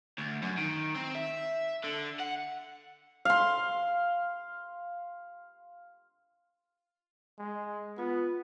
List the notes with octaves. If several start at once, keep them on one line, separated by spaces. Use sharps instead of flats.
D2
F#2
D#3
C4
E5
D3
F#5
F5 C6
G#3
B3 F4